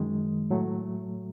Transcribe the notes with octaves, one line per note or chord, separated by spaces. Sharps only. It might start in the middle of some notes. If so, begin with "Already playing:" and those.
Already playing: F#2 D#3 G#3
A2 F#3 A3